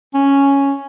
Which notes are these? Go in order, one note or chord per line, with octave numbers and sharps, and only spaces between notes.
C#4